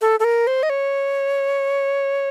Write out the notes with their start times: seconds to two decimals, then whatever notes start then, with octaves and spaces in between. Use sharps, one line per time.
0.01 A4
0.20 A4
0.24 A#4
0.47 C5
0.63 D#5
0.70 C#5